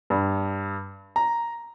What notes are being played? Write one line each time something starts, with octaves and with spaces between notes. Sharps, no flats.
G2
A#5